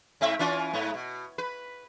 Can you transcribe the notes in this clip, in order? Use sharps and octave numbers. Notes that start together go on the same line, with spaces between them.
G#2 C4 E5
E3 C#4 F4
G#2 B3
B2
B4